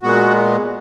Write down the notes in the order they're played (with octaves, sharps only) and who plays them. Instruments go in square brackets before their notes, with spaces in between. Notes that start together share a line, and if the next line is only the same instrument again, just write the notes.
[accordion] A#2 G#3 B3 F#4